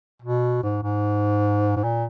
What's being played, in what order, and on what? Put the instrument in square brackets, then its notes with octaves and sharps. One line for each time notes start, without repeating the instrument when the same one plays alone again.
[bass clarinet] B2
G#2
G#2
G#2
A#2